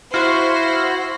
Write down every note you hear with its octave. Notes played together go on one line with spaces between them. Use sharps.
E4 F#4 C5 F5